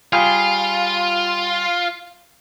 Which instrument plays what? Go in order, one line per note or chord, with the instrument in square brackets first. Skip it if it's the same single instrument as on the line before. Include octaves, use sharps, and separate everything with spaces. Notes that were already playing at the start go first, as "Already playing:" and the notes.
[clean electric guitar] G3 G#4 F5 [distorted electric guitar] F4